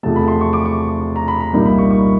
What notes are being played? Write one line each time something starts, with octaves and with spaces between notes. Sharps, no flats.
E2 C3 F3 A3 A5
B5
C6
C#6
D6
C#6
A#5
B5
A#5
C2 A#2 G3 A#3 D#4 B5
B5
C#6
C#6